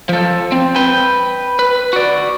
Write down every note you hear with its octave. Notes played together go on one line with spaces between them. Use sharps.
F3 A4
C4
B4 G5
B4
F#4 D5